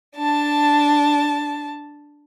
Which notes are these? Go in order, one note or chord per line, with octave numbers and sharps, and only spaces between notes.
D4 A5